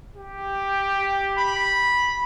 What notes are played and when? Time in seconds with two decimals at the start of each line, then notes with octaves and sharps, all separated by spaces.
0.16 G4
1.38 B5